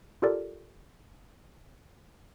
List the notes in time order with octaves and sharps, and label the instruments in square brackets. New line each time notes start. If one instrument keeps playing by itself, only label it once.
[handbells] F4 G4 A4 A#4 D5